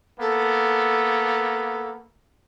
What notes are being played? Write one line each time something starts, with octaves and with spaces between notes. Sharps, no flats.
A#3 B3 A4